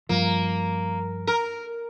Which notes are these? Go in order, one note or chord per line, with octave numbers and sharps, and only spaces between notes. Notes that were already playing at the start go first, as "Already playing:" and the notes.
G2 F3 A#3
A#4